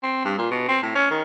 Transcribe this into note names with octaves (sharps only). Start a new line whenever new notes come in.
C4
G2
A#2
B2
C4
A2
C#4
D#3